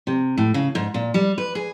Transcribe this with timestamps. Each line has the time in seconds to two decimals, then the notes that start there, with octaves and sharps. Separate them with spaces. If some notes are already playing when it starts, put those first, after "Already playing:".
0.07 C3
0.38 A2
0.54 C#3
0.75 G#2
0.94 A#2
1.14 G3
1.38 B4
1.55 G#4